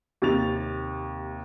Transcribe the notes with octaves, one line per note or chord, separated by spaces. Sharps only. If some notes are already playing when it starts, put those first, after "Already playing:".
D#2 C3 A6 F7